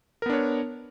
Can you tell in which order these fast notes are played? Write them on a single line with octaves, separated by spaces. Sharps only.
A#4 B3 D4 C#5